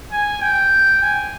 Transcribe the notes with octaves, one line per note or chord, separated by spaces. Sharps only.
G#5
G5
G#5